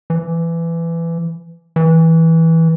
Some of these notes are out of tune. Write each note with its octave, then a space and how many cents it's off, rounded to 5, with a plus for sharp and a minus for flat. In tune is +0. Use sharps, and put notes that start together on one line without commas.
E3 +20
E3 -15